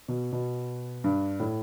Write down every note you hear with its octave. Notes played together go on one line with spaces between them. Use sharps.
B2
B2
G2
A2